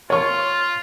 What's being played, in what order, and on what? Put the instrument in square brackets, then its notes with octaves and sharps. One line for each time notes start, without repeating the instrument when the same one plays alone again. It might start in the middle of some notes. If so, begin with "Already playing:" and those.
[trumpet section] F4 [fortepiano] C#5 C#6